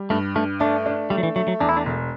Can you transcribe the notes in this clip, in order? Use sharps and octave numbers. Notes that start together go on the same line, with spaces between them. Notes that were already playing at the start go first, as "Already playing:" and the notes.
Already playing: G3
G2 A3
G2 A3
A3 D4
D4
G3 A3
F#3
E3
F#3 A3
F#3
E2 D4
E4
D4
E1